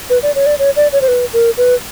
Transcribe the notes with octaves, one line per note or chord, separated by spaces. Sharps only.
B4
D5
C#5
D5
C#5
D5
C#5
C5
B4
A#4
B4